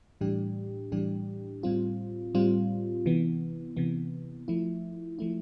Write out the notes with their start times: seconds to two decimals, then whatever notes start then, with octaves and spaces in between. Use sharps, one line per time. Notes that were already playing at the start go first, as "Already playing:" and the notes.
0.21 A2 E3 G3 D4 G4
0.92 A2 E3 G3 D4 G4
1.63 A2 G3 C4 F4
2.35 A2 G3 C4 F4
3.06 C3 E3 B3
3.76 C3 E3 B3
4.48 F3 A3 E4
5.19 F3 A3 E4